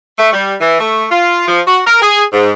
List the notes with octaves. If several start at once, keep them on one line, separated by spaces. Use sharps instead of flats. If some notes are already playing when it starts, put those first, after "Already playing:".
A3
G3
E3
A3
F4
F3
F#4
A#4
G#4
G#2